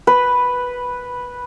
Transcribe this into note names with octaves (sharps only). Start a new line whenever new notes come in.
B4